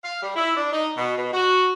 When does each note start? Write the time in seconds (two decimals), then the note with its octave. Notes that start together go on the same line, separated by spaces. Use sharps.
0.05 F5
0.23 G3
0.36 E4
0.57 D4
0.73 D#4
0.97 B2
1.17 B2
1.33 F#4